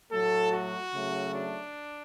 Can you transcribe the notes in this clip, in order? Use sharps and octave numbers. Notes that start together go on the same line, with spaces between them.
A2 F#3 A3 A4
F#4
C#3 F#3 A3
D4